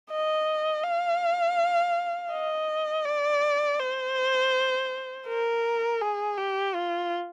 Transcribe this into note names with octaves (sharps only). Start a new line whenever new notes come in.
D#5
F5
D#5
D5
C5
A#4
G#4
G4
F4